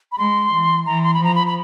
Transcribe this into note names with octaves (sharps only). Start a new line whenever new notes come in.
B5
G#3 C6
E3
E3 A#5
C6
B5
F3 A#5
B5
B5